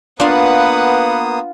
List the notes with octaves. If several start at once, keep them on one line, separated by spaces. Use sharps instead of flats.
A#3 B3 D4 F4 B4 F5 F#5 D#6